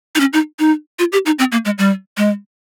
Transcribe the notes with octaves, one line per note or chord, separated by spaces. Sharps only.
D#4
C#4
D#4
D#4
F4
G4
D#4
C4
A#3
G#3
G3
G#3